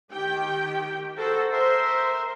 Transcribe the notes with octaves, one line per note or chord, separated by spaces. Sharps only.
D#3 G4 G5
F#4 A4 A#4 C5
A#4 C5 E5 C6